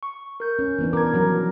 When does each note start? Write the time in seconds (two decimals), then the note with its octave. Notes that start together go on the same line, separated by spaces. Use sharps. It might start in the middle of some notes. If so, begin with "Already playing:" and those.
0.03 C#6
0.40 A#4 G6
0.59 C#4
0.79 E3 B3 D4
0.93 A#4 D6 G#6
1.13 F3 F#3 B3 A#4